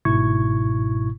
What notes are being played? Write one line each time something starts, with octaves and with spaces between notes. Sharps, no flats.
G1 G#2 B2 E4 C#6 G#6